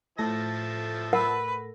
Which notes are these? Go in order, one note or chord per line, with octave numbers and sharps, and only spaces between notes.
A2 F3 A4 E5 A5 A#6
A#4 B4 F#5 E6